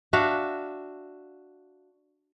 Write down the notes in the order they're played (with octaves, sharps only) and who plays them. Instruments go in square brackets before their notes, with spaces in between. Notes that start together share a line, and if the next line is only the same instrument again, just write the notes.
[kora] D4 F#4 E5 F5